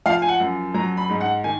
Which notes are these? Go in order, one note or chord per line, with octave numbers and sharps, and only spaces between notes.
F3 F5
G#5
F#5
F#2
F#3 A#5
B5
G#2
F#5
D#3 G#5